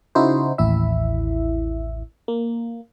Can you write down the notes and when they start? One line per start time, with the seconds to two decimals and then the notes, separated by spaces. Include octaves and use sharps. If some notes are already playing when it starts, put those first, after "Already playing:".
0.15 C#3 D#4 E4 F#4 C5
0.58 A1 D#2 E4 E5
2.28 A#3